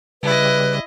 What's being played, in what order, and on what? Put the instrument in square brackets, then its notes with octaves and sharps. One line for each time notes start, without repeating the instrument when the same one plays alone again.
[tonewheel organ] C#3 G3 [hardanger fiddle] E4 D#5 [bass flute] B4